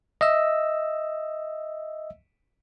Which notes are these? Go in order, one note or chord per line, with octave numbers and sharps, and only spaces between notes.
D#5 E5 E6